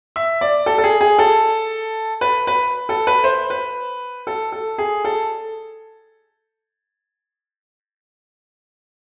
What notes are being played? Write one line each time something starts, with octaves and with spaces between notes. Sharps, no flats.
E5
D5
A4
A4
G#4
G#4
A4
B4
B4
A4
B4
C5
B4
A4
A4
G#4
A4